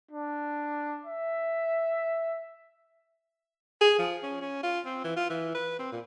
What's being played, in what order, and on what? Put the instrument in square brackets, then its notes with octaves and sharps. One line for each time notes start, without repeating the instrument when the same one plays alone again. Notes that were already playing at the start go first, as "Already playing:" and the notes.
[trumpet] D4
E5
[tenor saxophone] G#4
F3
C#4
C#4
F4
C4
E3
F4
E3
B4
C4
A#2